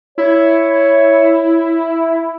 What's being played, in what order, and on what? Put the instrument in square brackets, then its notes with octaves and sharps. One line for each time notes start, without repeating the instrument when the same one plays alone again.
[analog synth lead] E4 [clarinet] C#5